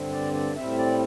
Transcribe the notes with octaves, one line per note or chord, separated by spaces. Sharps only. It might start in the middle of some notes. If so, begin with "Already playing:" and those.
Already playing: G2 D3 C4
D5
D5
A2 G3 C4 E5
D5